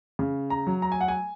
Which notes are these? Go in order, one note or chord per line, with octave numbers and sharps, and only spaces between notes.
C#3
A#5
F#3
A#5
G#5
F#5
G#5